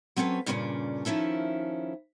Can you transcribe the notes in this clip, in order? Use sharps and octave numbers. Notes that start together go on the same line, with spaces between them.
F#3 C4 C#4 A4 B4 C#5
G2 A#2 C#3 A#3 C#4 D4
D#3 F3 C#4 E4 A4